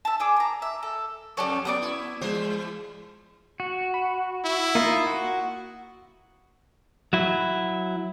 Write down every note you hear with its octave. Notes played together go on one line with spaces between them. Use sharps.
E5 A5
D4 G#4 D6
A5 A#5
E5
A4
F2 F#3 G4 A4 C#5 D5
F#3 B3 D5 C#6 D#6
E4
E3 G#3 A3 C5
F#4
B5
E4
A#3 D#4 F4 D#5
F#4
F#3 E4